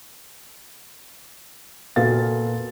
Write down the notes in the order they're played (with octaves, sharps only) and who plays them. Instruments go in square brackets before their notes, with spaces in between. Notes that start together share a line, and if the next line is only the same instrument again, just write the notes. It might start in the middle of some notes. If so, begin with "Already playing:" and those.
[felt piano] A#2 B3 F#4 A4 F5 A6